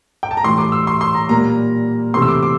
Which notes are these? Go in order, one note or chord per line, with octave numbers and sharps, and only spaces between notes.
G5
A5
A#5
A2 E3 G3 C6
D6
E6
C6
C6
A#5
A#2 G3 A#3 A#5
C3 E3 A3 C4 C6
E6
D6
D6